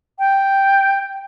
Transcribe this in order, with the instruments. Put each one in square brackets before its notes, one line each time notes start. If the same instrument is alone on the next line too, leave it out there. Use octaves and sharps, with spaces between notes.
[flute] G5